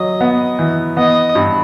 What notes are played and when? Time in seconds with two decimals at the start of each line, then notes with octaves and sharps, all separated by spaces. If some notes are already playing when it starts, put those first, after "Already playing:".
Already playing: F#3 D#5
0.21 B3
0.59 E3
0.97 B3 D#5
1.35 G2